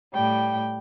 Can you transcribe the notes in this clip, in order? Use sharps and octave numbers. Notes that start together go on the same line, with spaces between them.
A2 G3 G5